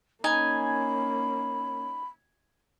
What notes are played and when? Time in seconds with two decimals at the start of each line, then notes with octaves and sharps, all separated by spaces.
0.24 A#3 C#4 D#4 G#5 B5